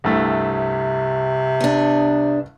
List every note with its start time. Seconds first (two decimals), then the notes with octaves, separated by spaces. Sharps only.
0.04 C2 G2 C3 A3
1.61 B3 D4